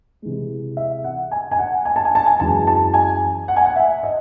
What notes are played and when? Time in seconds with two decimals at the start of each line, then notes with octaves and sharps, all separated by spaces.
0.22 C3 E3 G#3
0.77 E5
1.04 F#5
1.31 G#5
1.51 G#5
1.59 F#5
1.85 G#5
1.96 A5
2.05 G#5
2.15 A5
2.26 G#5
2.40 F#2 E3 G#3 A5
2.67 A5
2.94 G#5
3.48 F#5
3.56 G#5
3.66 F#5
3.76 E5
4.03 D#5